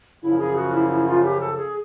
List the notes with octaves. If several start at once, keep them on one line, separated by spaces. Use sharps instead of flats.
F#2 C#3 F3 E4
G#4
F#4
E4
E4
F4
G4
A4
G#4